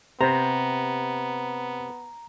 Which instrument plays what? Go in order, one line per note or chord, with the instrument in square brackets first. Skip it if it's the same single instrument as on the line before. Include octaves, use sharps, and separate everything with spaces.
[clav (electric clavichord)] C3 [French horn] B3 [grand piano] C5 [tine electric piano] A#5